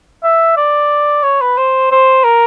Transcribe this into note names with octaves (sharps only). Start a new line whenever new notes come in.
E5
D5
C#5
B4
C5
C5
A#4